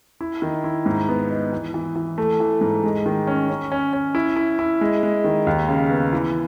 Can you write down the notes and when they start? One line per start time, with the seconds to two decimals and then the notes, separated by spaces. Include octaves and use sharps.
0.21 E4
0.42 D#3
0.64 E4
0.86 G#2
1.09 B3
1.31 D#4
1.53 E3
1.74 E3
1.96 E3
2.18 A3
2.40 E3
2.61 G#2
2.84 G#3
3.06 D#3
3.27 C#4
3.50 C#4
3.72 C#4
3.93 C#4
4.15 E4
4.36 E4
4.59 E4
4.81 G#3
5.03 G#3
5.24 D#3
5.47 D#2
5.68 C#3
5.90 B3
6.13 E3